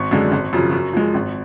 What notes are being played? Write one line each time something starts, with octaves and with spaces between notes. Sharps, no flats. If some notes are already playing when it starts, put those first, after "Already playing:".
Already playing: G#1 C#6
F#2 D3 G#3
G#1
F#2 C#3 F3
F#2
F3 G#3
G#1